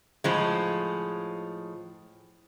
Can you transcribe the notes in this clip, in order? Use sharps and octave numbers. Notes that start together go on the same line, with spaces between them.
A2 F3 G#3